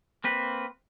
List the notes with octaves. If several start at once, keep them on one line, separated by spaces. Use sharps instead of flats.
A#3 C4 B4